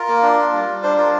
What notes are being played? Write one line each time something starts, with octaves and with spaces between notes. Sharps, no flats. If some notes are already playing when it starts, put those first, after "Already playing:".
Already playing: F4 A#4
A#3
D4
F4
G3
G3
D4 C5
F4 A#4